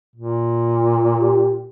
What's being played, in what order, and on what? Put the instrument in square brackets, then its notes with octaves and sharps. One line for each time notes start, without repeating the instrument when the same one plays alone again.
[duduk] A#2
[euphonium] G4